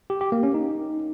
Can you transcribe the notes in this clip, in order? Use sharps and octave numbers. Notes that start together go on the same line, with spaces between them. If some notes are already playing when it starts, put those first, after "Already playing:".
G4
G4
A#3
C#4
D#4